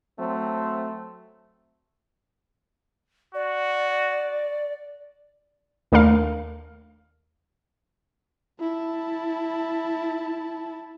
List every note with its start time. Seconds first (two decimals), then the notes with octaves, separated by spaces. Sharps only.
0.19 F#3 A3 C4
3.34 F#4 D5
5.92 D#2 A3 D4 A#4 F5
8.61 E4 A5